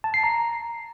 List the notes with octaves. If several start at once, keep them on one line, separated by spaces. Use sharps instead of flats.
A5
C7
A#5